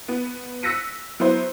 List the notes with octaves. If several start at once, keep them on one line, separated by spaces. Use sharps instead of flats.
B3
E6 F#6 A#6 B6 C#7 D#7
F#3 B3 E4 C5